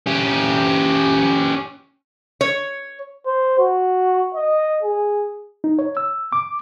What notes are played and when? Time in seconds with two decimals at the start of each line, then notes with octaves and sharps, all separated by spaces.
0.06 C#4 G4
2.41 C#5
3.26 C5
3.59 F#4
4.35 D#5
4.83 G#4
5.64 D#4
5.79 C#5
5.97 E6
6.32 D6